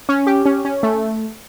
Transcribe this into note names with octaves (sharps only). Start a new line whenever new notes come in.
C#4
G4
C#4
C#4
A3